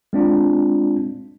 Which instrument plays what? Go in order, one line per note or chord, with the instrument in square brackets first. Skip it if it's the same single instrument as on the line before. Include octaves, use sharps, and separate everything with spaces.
[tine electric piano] G#3 C4 D4 F4